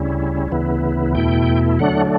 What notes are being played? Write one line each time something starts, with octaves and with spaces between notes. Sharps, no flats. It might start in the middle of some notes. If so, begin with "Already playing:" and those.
Already playing: D2 C#3 G3 C#4 E4
D2 C#3 E3 B3 E4
E2 B2 A3 E4 G5
D3 F#3 A3 D4 F#5